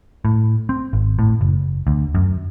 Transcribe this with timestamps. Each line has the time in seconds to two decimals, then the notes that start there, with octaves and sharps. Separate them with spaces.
0.25 A2
0.69 C4
0.93 G#1
1.19 A2
1.41 F#1
1.87 D2
2.15 F#2